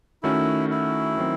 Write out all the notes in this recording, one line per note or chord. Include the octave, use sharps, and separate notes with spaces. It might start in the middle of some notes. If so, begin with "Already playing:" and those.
D#3 A3 C#4 E4 F#4
E4
D#3 F#3 C4